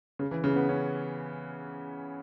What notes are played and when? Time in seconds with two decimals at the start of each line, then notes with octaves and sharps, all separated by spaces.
0.19 C#3
0.31 E3
0.44 C#3
0.56 B3
0.69 C#4